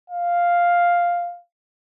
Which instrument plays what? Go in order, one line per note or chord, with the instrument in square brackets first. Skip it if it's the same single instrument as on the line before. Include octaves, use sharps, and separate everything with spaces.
[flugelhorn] F5